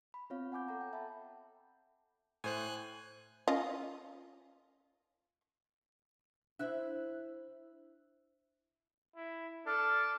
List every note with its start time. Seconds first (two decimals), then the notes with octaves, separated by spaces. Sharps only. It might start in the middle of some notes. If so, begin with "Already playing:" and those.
0.14 B5
0.30 B3 C4 F4 C#5 F5
0.52 F#5 G#5 D6 G6
0.68 A4 F#5 A#5
0.81 G5
0.93 E5 A5 B5
2.44 A2 C5 G#5 F#6
3.48 C#4 F4 D#5
6.59 D4 E4 C5 E5 F#6
9.16 E4
9.66 D4 A4 F6